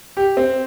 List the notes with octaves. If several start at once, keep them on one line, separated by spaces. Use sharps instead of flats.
G4
C4